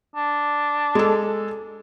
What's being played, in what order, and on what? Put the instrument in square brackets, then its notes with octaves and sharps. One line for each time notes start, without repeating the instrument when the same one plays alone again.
[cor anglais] D4
[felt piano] G#3 A4